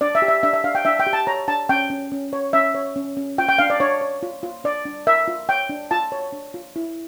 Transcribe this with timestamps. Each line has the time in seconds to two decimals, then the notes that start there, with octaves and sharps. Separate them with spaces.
0.01 D4 D5
0.15 E5
0.22 G4
0.28 E5
0.43 D4 E5
0.53 E5
0.64 D4 F5
0.75 G5
0.85 D4 E5
1.00 G5
1.07 G4
1.13 A5
1.27 C#5 A#5
1.48 D4 A5
1.69 C#4 G5
1.90 C#4
2.12 C#4
2.33 C#5
2.53 C#4 E5
2.75 C#5
2.96 C#4
3.17 C#4
3.38 F4 G5
3.49 G5
3.58 D4 F5
3.70 D5
3.80 D4 C#5
4.01 C#5
4.23 F4
4.43 F4
4.64 D4 D5
4.85 D4
5.07 A#4 E5
5.28 F4
5.49 C#5 G5
5.69 D4
5.91 F4 A5
6.12 C#5
6.33 D4
6.54 F4
6.76 E4